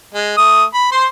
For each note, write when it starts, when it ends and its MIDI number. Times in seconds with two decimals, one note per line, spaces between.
0.14 0.34 56
0.38 0.64 57
0.38 0.64 87
0.74 0.91 83
0.92 1.06 72
0.92 1.06 84